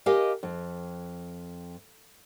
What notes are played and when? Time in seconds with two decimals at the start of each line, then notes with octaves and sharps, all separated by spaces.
0.06 G4 A#4 D#5 F5 G#5
0.43 F2